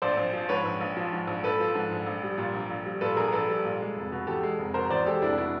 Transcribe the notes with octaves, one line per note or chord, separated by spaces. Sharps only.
A#1 C5 D5
A#1
F3
G#2 B4 C#5
A#1
A#1
F3
G#2
A#1
A#1 A4 B4
F3
G#2
A#1
A#1
G3
A#2
A#1
A#1
G3
A#2 A4 B4
A#1 G#4 A#4
A#1 A4 B4
G3
A#2
G#3
F1
B2
E2 G4 A4
G#3
F1
B2 A#4 C5
E2 C5 D5
G#3 G4 A4
F1 D4 E4
B2 D4 E4